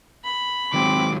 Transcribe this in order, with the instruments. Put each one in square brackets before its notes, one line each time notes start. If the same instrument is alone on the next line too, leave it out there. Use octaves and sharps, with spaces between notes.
[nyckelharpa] B5
[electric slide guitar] D#3 F#3 G#3 [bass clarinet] C4 [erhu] D6